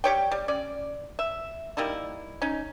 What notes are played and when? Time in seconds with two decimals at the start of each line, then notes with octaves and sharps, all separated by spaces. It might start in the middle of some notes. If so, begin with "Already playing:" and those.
0.04 G3 G4 C#5 G5
0.32 G3
0.48 C#4 D5
1.19 E5
1.77 G3 A#3 D#4 E4
2.42 C#4 D#4